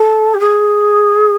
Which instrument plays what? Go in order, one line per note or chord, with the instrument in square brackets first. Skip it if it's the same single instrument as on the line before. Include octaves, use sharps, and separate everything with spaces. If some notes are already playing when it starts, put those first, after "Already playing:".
Already playing: [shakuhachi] A4
G4
G#4